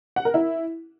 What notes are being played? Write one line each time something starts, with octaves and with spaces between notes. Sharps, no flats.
F#5
A#4
E4